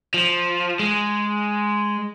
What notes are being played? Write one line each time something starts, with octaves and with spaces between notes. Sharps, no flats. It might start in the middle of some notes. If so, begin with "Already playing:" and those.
F3
G#3